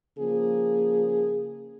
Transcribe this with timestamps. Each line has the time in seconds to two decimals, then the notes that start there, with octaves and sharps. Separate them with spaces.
0.18 C#3 F3 A#3 G#4